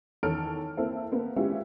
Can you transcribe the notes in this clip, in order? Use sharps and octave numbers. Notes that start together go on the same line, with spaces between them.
E2 D#3 A4 C#5 F6 D7
A#3 C4 E4 A4
A#3 B3
G#3 B3 C#4 E4 F4 G4